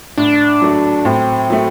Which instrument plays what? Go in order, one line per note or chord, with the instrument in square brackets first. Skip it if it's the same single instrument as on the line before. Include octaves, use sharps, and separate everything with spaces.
[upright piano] A2 [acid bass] D4
[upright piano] F#3 A3
[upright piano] A2 [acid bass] C4
[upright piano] F#3 A3